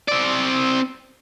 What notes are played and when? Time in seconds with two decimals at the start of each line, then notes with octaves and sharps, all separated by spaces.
0.08 C4 D5